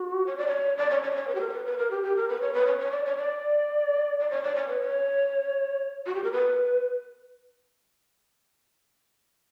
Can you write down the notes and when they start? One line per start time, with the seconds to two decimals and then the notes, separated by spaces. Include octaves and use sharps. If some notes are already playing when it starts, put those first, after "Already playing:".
Already playing: F#4
0.27 C#5
0.37 D5
0.47 C#5
0.77 D5
0.90 C#5
1.03 C#5
1.11 D5
1.15 C#5
1.28 B4
1.35 G4
1.40 A#4
1.49 C#5
1.53 B4
1.66 B4
1.78 A#4
1.91 G4
2.03 G4
2.16 A#4
2.29 B4
2.41 C#5
2.54 B4
2.66 C#5
2.79 C#5
2.91 D5
3.05 C#5
3.17 D5
4.20 D5
4.30 C#5
4.43 D5
4.55 C#5
4.68 B4
4.81 C#5
6.06 F#4
6.15 G4
6.24 A#4
6.32 B4